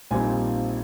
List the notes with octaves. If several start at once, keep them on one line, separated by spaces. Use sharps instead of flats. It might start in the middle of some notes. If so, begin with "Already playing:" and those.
A#1 A#2 G3 C4 D#4 G#5